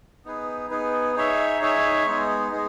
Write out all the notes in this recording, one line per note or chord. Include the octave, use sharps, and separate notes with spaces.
B3 D#4 G#4 B4
B3 D#4 G#4 B4
D#4 G#4 C#5 E5
D#4 G#4 C#5 E5
G#3 B3 D#4 G#4
G#3 B3 D#4 G#4